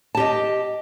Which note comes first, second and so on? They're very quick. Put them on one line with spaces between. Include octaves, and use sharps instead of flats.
A5 G4 D#5